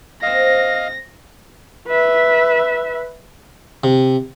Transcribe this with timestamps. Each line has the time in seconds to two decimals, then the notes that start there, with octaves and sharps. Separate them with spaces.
0.22 A#3 C4 D#5 F5 A#6
1.87 B4 E5
3.84 C3